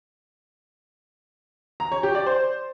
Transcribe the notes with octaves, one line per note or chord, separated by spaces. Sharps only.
A#5
C#5
G4
D5
C5